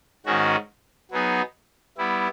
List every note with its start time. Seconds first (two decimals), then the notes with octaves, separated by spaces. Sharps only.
0.26 G#2 D#3 G#3 C#4 F#4
1.11 F#3 B3 D#4 G#4
1.98 G3 B3 E4